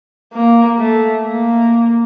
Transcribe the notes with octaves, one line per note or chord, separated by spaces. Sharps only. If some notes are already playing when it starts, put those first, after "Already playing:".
A#3
A3
A#3